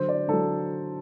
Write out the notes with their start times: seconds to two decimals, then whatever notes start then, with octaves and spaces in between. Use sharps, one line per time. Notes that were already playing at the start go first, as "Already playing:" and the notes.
Already playing: D3 F#3 C5
0.08 D5
0.28 D3 F#3 A4